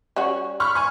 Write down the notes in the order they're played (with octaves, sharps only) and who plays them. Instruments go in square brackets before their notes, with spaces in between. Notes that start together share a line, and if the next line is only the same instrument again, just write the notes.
[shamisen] G3 C#4 F#4
[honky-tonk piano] B5 C#6 F6
G#5 C#6